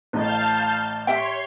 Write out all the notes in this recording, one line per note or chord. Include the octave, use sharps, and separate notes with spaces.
A1 A2 D#5 F5 A5 G6
G4 C#5 E5 G5 C6